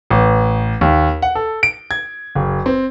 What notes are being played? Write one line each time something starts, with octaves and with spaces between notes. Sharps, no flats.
A1
D#2
F#5
A4
D7
G#6
F#1
C4